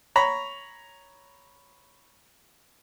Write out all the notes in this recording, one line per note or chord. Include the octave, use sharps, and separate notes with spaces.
C#5 A#5 B5